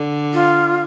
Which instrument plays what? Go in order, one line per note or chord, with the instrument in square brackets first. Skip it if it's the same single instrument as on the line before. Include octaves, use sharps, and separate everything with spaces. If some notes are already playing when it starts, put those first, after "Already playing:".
Already playing: [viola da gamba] D3
[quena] F4